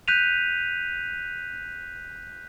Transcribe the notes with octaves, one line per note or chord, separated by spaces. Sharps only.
F#6 G6 B6 D#7 F7